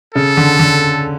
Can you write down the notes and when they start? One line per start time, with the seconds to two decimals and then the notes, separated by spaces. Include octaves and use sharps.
0.15 C#3 A4
0.37 D3
0.59 D3